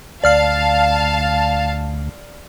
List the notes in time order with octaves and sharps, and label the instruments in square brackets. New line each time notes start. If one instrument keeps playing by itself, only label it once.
[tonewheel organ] D2 [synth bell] D5 F6 C7 [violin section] F5 A5